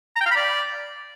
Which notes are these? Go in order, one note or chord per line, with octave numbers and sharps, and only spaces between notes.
A#5
G5
F5
B5
D5